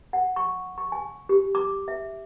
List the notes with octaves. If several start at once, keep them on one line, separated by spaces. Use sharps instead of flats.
F#5
C#6
C#6
G#5
G4
D6
E5